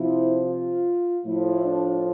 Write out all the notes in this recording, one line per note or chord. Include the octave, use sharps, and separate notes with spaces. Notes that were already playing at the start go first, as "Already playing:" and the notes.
Already playing: C3 F3 E4
F4
A2 F3 E4
D4